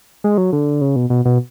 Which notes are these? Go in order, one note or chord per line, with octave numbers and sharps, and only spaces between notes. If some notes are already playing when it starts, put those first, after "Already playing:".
G#3
F#3
D3
C#3
B2
B2
B2